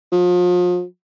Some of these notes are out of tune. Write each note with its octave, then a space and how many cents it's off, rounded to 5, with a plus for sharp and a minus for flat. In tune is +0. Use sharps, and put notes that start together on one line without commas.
F3 +35